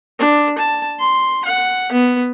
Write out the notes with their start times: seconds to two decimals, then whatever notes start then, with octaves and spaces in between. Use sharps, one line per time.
0.19 D4
0.58 A5
0.99 C6
1.45 F#5
1.92 B3